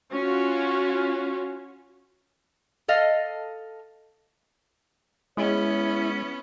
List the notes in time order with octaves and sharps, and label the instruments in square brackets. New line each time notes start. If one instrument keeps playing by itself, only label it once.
[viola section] C#4 F4 F#4
[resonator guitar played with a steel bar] A4 D#5 F5
[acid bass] G#3 [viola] B3 C#4 [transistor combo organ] E4 [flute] C#5